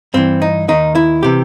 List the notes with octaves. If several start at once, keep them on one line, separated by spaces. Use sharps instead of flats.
G2 E3 C4
D#4
D#2 D#3 D#4
E4
C3 E3 G4